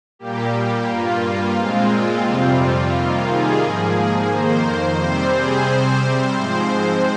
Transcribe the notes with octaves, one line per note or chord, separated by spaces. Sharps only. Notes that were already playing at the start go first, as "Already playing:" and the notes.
A#2 G3 A#3 G4
G2 G3 A#3 F4
A#2 G#3 C4
F2 C3 G3 C4
C3 D#3 G3 A#3 F4
G#4
G#2 F3 A#3
F2 D#3 A#3 C5
C3 G3 C4 C5
G#4
C3 G3 C4 C5
G#2 F3 G#3 C4